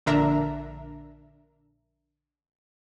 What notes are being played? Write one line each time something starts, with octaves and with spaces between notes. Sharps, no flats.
A#1 D3 D4 A#4 E5 A#5